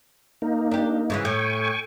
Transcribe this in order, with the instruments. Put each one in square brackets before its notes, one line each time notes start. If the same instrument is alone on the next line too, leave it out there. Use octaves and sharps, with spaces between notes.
[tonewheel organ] A#3 D#4
[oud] D4 G4
G#2 C#3 E3
[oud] A2 [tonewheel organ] G5 G#5 C#6